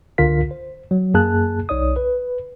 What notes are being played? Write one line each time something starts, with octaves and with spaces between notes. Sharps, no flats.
C#2 D3 F4 A#4 F5 B6
C5
F#3
F#2 A#3 G#4 A5 F#6
B1 D#4 C#5 D5 D#6
B4